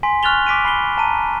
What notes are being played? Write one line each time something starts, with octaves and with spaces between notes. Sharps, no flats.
G#5 C6 B6
C#6 F6 F#6 A6 F7 G7
D6 B6 D7 D#7
B5 C7 G7
A5 A#5 D#7